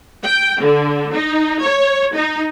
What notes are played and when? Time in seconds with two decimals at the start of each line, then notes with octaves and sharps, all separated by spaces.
0.23 G5
0.61 D3
1.13 D#4
1.62 C#5
2.15 D#4